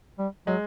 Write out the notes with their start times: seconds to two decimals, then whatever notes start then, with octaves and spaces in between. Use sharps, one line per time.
0.19 G3
0.47 F#3 G#3